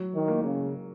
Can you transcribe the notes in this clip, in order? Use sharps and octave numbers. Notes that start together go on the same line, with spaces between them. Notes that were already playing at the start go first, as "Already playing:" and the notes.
Already playing: F#3
D#3
A#3
C#3